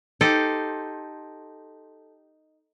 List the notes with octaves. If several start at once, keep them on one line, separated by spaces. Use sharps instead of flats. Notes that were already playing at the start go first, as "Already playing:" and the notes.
D#4 G4 A4 C5